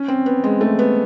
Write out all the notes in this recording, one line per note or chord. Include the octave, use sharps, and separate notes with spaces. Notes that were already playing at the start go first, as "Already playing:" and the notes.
Already playing: C#4
C4
B3
G#3
A3
B3